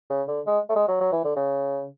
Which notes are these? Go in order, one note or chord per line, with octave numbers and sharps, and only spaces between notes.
C#3
D3
G#3
A3
G#3
F#3
F#3
E3
D3
C#3